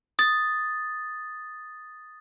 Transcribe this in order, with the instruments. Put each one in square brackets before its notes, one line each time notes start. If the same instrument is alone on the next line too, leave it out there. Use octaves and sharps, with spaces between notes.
[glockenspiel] D#6 A6